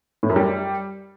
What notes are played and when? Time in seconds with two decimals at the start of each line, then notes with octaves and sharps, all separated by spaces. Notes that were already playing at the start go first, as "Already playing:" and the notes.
0.23 A2
0.29 F#2
0.36 G3